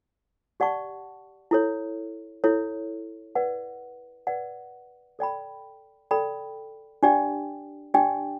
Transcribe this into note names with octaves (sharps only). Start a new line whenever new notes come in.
G4 D5 F#5 A5 C#6
E4 A4 C#5
E4 A4 C#5
B4 D5 F#5
B4 D5 F#5
A4 D5 G5 B5
A4 D5 G5 B5
D4 G4 D5 G5
D4 G4 D5 G5